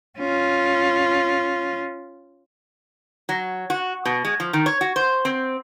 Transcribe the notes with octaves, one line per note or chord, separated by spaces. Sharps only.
C#4 F4
F#3
F#4
B2
G#3
F3
D#3
C#5
F#4
C5
C4